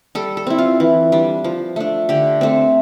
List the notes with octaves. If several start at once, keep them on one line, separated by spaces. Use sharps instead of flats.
G3 A4
A4
C4 E4
F4
E3
G3 D4
F3
A3 D4
D3 G4
A3 C4